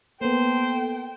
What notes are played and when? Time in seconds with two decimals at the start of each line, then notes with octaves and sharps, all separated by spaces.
0.21 A#3 B3 A4 C5 G5